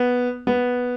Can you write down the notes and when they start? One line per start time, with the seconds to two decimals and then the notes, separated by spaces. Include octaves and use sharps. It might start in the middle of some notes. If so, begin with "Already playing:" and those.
Already playing: B3
0.47 B3